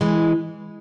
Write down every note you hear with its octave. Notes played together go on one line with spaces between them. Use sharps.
E3 G#3